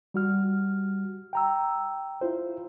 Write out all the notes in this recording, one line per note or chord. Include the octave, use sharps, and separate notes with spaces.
G3 F#4 F6
G5 A#5 E6
E4 F4 C5